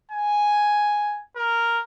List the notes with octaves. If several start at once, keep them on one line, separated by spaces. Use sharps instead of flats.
G#5
A#4